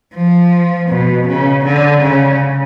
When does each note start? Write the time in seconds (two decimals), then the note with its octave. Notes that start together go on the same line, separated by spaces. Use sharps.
0.14 F3
0.89 B2
1.28 C#3
1.65 D3
2.02 C#3